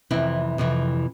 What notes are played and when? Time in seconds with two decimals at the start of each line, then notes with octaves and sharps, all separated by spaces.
0.10 F2 C3 E3 C4 E4
0.58 F2 C3 E3